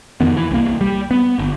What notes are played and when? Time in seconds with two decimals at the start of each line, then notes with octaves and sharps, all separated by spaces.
0.21 F2 D#3 B3
0.37 E3
0.51 C2 A#3
0.81 G3
1.11 B3
1.39 G1